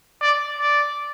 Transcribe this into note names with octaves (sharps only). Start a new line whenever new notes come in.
D5
D5